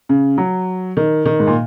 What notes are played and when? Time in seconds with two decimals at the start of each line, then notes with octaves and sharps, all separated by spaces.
0.09 C#3
0.38 F#3
0.97 D#3
1.26 D#3
1.40 G#2
1.47 A#2